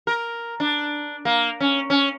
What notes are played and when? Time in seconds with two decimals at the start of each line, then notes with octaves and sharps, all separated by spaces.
0.07 A#4
0.60 D4
1.25 A#3
1.60 C#4
1.90 C#4